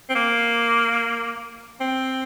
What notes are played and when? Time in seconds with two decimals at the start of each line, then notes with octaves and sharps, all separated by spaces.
0.10 C4
0.15 A#3
1.80 C4